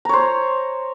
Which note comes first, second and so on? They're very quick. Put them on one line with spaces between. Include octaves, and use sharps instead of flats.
A#5 C#5 C5